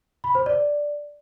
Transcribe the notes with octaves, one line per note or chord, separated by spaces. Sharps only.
B5
C5
D5